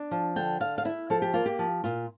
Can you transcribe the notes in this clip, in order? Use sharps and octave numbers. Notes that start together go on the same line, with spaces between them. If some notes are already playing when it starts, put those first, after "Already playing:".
Already playing: D4
F3
D3 G5
D3 F5
F5
E4 E5
F3 A4
G4
A#3 F4
G4
F3
A#2 F4